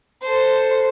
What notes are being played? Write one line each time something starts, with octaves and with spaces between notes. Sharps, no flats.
A4 C5